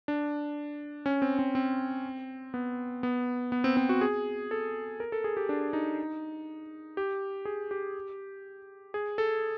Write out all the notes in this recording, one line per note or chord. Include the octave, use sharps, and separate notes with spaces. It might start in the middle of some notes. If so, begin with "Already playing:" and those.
D4
C#4
C4
C4
C4
B3
B3
B3
C4
C4
F#4
G#4
A4
A#4
A4
G#4
G4
D4
D#4
G4
G#4
G4
G#4
A4